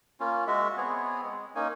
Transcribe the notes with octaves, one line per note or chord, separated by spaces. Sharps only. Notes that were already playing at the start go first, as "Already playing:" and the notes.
A#3 C#4 F4
G#3 F#4 E5
B3 C4 G#4 C#5
G#3
A#3 C#4 D#4 G#5